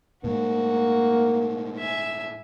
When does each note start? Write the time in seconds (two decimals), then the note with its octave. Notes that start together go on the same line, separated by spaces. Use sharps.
0.24 A2 G#3 A#3 F#4
1.78 E5 G#5